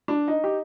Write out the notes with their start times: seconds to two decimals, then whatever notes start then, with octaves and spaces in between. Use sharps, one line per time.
0.08 D4
0.28 D#4
0.44 G4